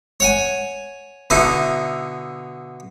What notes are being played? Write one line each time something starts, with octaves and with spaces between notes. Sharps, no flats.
C#5 F#5 G#5
B2 D3 D#4 E4